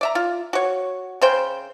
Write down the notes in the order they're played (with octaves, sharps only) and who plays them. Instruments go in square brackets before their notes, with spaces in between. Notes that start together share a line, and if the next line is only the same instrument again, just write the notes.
[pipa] D5 E5 A#5
F4
F#4 C#5
C#3 C5 G5